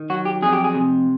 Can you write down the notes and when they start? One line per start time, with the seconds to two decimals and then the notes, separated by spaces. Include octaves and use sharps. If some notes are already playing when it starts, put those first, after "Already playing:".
Already playing: D#3
0.10 F#3 F#4
0.25 G4
0.42 F2 G#4
0.53 G4
0.64 G#4
0.75 C3